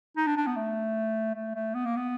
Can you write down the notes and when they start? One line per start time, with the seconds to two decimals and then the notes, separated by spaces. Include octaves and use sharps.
0.17 D#4
0.27 D4
0.37 D4
0.47 B3
0.56 A3
1.35 A3
1.55 A3
1.75 B3
1.85 A#3
1.96 B3